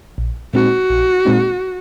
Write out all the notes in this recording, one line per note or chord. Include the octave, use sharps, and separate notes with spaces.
A#1
A#2 G#3 C4 D#4 F#4
A#1
A#2 G#3 C4 D#4